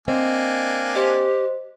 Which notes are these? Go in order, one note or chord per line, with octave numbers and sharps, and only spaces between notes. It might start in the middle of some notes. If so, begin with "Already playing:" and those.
A#3 C4 D4 D#5 G#5
G4 C5 D#5